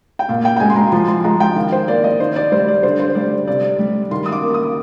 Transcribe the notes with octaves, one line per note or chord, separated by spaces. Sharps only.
G5
A#2 F5
G5
G5
G#3 G#5
C6
A#5
F3 C6
C6
G#3 A#5
G5
D#3 F5
C5
A#3 D5
D#5
D#3 C5
D5
G3 C5
D5
D3 C5
C5
C5
G3 D5
C3 D5
G3
D#3 C6
D#6
D6
A#3
D#6